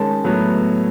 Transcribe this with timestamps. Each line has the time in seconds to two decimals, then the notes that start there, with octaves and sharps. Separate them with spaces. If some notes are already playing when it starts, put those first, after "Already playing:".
Already playing: D#3 G#3 C#4 A5
0.24 A2 F#3 B3